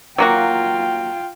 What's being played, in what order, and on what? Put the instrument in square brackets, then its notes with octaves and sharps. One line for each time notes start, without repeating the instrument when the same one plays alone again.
[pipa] F#3 A#3 F#4 [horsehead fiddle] F4 G5